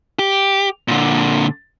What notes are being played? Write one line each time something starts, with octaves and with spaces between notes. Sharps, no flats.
G4
A#2 D3